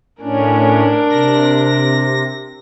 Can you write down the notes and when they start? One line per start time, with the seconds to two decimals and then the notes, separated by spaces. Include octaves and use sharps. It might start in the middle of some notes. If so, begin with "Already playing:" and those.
0.21 A2 C#4 D4 A#4
1.10 C3 A#6